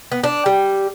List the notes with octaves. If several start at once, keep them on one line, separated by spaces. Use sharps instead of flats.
B3
D4
G3